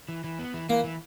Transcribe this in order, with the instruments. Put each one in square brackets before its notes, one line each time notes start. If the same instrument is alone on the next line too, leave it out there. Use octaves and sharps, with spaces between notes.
[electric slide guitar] E3
E3
B3
E3
[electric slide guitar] E3 [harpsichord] A#3
[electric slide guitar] E3